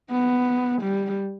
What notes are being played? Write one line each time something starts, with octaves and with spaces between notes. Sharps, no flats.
B3
G3